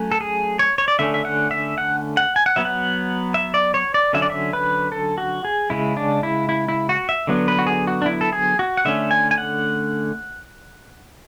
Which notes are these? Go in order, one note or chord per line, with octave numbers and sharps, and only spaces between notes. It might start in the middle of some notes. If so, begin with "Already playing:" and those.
Already playing: F#3 A3 C#4
A4
G#4
C#5
C#5
D5
D3 A3 C#4 E5
E5
F#5
E5
F#5
F#5
G#5
F#5
F#3 B3 E5
F#5
E5
D5
C#5
D5
D3 F#3 C#4 E5
D5
E5
B4
A4
F#4
G#4
C#3 G#3 C#4 E4
D4
E4
E4
E4
F#4
E5
D3 F#3 B3
B4
F#4
G#4
F#4
D4
E4
A4
G#4
F#4
F#5
D3 A3 C#4 E5
G#5
G#5
F#5